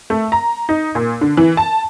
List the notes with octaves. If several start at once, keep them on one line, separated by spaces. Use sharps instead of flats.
A3
A#5
D#4
A#2
D3
E3
A5